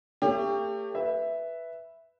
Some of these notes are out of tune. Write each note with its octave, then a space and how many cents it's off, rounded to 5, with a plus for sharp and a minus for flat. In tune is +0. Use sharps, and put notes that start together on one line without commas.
A3 +40 G4 +25 C#5 +25
B4 +0 E5 +0